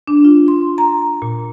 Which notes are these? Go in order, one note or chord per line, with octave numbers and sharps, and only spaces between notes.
D4
F4
C6
A#5
A#2